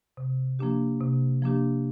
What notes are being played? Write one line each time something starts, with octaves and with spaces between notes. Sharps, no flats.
C3
F3 A#3 D4 G4
C3
F3 A#3 D4 G4